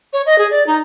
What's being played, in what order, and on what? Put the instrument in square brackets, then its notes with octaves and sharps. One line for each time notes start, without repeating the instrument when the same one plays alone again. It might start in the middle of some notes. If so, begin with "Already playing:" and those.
[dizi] C#5
D#5
G#4
D5
D#4